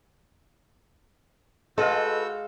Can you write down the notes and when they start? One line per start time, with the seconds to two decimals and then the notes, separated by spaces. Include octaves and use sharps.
1.78 G#3 F#4 A4 B4 D#5 F5 E6 G6